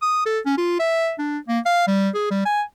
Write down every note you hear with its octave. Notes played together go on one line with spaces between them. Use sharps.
D#6
A4
C#4
F4
E5
D4
A#3
F5
G3
G#4
G3
G#5